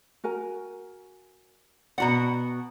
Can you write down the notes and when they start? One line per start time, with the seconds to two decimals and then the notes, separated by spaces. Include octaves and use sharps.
0.24 F#4 A#4 G#5
1.98 B2 F#4 D5 F#5 A#5